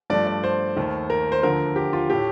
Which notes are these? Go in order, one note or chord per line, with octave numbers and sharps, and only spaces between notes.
G2 F3 A3 D5
D5
C5
D#2 D#3 A3
A#4
C5
D2 D3 F3 A#4
G4
F4
A2 A3 G4